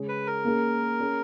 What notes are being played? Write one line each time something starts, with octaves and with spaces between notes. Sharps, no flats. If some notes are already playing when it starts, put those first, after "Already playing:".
Already playing: C#3 G#3 C#4 G#4
B4
A#4
A#3 C#4 G#4
A#3 C#4 G#4